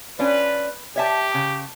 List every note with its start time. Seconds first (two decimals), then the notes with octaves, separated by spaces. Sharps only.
0.19 C#4 D4 F4 B4
0.96 G4 C#5 E5 A5
1.34 C#3